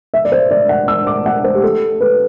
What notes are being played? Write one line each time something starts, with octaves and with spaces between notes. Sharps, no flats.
E5
D5
C5
D5
F#5
E6
D6
F#5
C5
G4
A4
B4